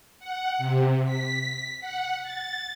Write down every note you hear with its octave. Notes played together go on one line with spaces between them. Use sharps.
F#5
C3
B6
F#5
A6